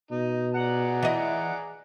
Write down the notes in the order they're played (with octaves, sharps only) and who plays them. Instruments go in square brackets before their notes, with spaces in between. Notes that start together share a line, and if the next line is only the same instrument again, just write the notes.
[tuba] B2 [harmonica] D#4
[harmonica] G#4 D5 A#5 [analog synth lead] F#5
[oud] E3 D#5